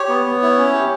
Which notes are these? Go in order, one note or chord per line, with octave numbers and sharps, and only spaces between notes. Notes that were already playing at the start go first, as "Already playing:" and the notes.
Already playing: G4 C#5
B3
B3
E4
C#4
G4